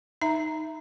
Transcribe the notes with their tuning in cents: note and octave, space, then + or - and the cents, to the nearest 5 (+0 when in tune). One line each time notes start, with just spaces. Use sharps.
D#4 +0 E5 +0 A#5 +0